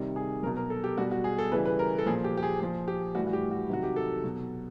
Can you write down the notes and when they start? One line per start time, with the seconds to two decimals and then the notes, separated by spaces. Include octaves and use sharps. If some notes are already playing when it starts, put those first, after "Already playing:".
Already playing: C3 D#3 G3
0.16 G#4
0.43 F#3 A#4
0.46 B2
0.57 A#4
0.70 A4
0.84 G4
0.98 B2 G3 F#4
1.11 F#4
1.24 G#4
1.38 A4
1.52 C#3 E3 G3 B4
1.65 B4
1.79 A#4
1.99 A4
2.06 A#2 F3 G#4
2.24 G4
2.37 G4
2.43 G#4
2.60 A#2 F3 G#4
2.88 G4
3.15 A2 E3 G3 F#4
3.27 F#4
3.33 G4
3.51 F#4
3.70 C3 D#3 F#3 F#4
3.83 G4
3.96 A4
4.24 B2 F#3